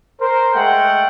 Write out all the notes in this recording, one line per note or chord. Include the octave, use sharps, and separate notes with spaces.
A#4 C5
G#3 A3 F#5 G5